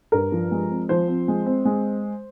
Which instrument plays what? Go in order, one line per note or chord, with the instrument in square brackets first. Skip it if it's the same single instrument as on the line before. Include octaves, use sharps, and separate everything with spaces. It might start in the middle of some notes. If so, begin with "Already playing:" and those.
[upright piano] G2 A#4
F3
G#3
C4
F3 C5
C4
G#3
C4
G#3